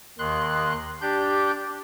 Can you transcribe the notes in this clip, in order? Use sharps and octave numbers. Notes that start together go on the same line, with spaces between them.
D#2 D#3 C6 F#6
D4 G4 G6